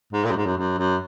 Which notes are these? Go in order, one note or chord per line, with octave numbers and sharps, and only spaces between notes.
G#2
A#2
F#2
G#2
F#2
F#2
F#2